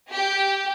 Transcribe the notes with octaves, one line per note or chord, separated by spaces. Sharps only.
G4